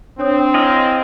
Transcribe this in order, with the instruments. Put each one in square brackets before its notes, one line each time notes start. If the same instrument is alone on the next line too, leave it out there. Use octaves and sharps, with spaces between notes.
[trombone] C4 [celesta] D4 C#5 D#6
[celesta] E4 [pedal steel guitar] G#4 D#5 F5